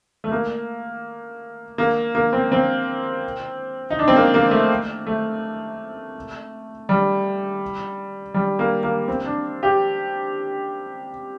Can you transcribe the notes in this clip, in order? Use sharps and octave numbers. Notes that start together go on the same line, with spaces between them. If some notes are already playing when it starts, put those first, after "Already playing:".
A3
A#3
A#3
A#3
C4
C4
D#4
D4
C4
A#3
A#3
A3
A3
G3
G3
A#3
A#3
C4
D4
G4